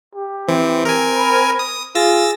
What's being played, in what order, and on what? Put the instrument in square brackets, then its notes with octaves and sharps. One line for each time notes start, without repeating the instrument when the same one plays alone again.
[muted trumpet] G4
[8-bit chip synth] E3 [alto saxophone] C4
[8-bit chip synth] A#4 G#5
[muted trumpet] B5
[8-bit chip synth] D#6
[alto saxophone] F4 [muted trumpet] G#4 [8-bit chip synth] E6 A6 A#6